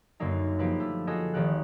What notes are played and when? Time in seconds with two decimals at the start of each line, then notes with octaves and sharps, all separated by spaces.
0.20 F#2 D3 F#3 A#3 D#4
0.59 F3 A#3 G4 B4
0.80 A3
1.07 F4 F#4 G#4 A4 D#5
1.34 G#1 D#3 F3 G4 F#6